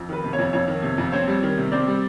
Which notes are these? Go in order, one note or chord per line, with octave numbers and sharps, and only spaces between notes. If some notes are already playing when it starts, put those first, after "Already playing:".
Already playing: F2
D#3 B4
C3
C#5
F2
F2 C#5
D#3
C3
F2
C4 C#5
G3
D#3
C3
C4 D5
G3